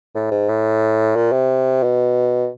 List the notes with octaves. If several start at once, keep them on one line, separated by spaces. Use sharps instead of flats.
A2
G#2
A2
A#2
C3
B2